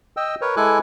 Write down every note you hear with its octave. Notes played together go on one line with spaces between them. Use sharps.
D#5 G5 E6
A#4 B4 C#5
G#3 E4 A4 G#5 D6 F#6